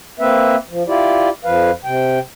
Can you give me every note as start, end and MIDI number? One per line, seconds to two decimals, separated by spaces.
0.20 0.56 58
0.20 0.56 60
0.20 0.56 71
0.20 0.56 76
0.70 0.83 53
0.88 1.29 64
0.88 1.29 65
0.88 1.29 67
0.88 1.29 74
1.45 1.71 41
1.45 1.71 53
1.45 1.71 71
1.45 1.71 77
1.85 2.19 48
1.85 2.19 79